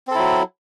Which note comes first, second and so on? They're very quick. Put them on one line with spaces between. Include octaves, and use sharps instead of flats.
C4 A4 E4 F#3